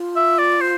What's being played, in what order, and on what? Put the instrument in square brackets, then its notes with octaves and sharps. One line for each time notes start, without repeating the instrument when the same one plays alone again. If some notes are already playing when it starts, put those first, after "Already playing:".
Already playing: [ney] F4
[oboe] E5
D5
C5